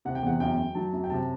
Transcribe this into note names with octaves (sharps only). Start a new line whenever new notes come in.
C3 F#5
G5
E2 F#5
F#2 G5
F#2
F#3 A5
F#2
G5
C3 A5